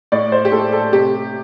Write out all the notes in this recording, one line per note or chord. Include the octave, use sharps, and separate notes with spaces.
A2 D5
C5
G4
A2 A4
A4
C3 G4